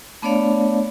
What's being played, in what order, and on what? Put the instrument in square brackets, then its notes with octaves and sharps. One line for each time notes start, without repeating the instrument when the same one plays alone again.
[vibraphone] A3 B3 D4 C#5 D5 F5